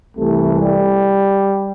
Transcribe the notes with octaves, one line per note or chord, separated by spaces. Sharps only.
C2 C3 E3 A3
G3